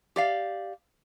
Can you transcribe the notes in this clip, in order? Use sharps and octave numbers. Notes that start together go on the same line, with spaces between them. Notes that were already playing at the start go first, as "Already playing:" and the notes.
G4 D5 F5